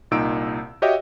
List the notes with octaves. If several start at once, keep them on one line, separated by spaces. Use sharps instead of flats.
C2 A#2 D#4 E6 D7
F#4 G4 C#5 D#5 E5 G5